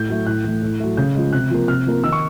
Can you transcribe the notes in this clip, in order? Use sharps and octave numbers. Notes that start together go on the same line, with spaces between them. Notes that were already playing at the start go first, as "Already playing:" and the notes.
Already playing: A2 G6
F#3 A3
A2 F#6
E3 A3
A2
F#3 A3
C#3 G6
F3 G#3
C3 F#6
F3 A#3
C3 F6
F3 A#3
D#3 E6
C#6